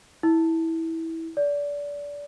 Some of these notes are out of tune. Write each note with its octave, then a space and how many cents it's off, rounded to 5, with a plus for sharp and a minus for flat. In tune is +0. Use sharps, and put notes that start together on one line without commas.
E4 -15
D5 -25